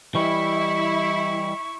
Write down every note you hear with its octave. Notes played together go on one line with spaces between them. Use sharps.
E3 G3 E4 D#5 C#6